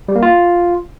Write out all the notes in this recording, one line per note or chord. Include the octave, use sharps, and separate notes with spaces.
G3
A#3
F4